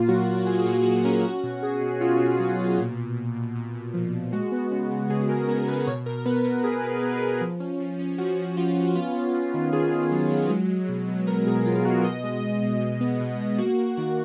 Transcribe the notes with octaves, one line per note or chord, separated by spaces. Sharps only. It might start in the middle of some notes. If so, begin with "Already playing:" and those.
Already playing: A#2 A#3 F4
F#3 F#4
A#2
F#3 G#4
A#2 F4
A#3 F#4
C#4 A#4
C#4 F#4
B2
B2 G#4
B2
C#4 F4
B2
F#3
B2
A#2
A#2
A#2
A#2
A#2
A#2
F3
A#2
G#3 F#4
B3
C#3
C#3
C#3 G#4
G#3 A#4
B3 A#4
A#4
C#3 B4
B2 C#5
B2 A#4
B3 B4
B2 A#4
B2 G#4
B2
B3
B3
F3
C#4
F3
C#4
F3 F#4
F3
F3 F4
C#4
F#4
B3 F4
B3
B3
D#3
D#3 G#4
D#3
F#3
F#3
G#3
G#3
B2
B3
B3 A#4
B2 G#4
B2 F4
B2 F#4
B2 D#5
G#3
B2
B2
B2
B3
B2
B2
A#3 F#4
A#3
D#3 F#4